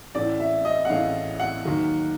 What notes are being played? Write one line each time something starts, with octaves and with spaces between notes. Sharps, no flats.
A1 A2 E3 D5
E5
D#5
F#5
A1 A2 E3 F5
F#5
D#2 D#3 F#3